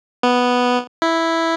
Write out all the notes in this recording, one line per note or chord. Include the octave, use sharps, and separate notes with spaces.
B3
E4